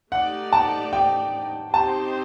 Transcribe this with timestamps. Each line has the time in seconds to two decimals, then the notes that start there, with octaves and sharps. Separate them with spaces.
0.12 A3 D#4 G4 D5 F#5
0.53 A5
0.93 G5
1.73 C4 D#4 G4 C5 A5